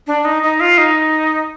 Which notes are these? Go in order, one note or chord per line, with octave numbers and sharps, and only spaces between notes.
D4
D#4
D#4
F4
D#4